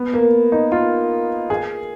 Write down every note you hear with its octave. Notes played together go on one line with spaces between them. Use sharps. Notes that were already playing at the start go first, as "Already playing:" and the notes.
Already playing: B3
A#3
D#4
F4
G#4